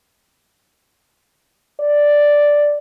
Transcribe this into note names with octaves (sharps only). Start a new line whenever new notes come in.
D5